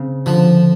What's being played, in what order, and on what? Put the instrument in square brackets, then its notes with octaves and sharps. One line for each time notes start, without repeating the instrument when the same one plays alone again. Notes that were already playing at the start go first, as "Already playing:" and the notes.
Already playing: [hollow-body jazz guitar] C#3 C4
[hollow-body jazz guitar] D3 [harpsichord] F3